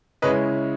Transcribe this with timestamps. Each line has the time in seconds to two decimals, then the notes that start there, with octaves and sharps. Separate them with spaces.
0.22 C#3 G#3 C#4 E4 B4 D#5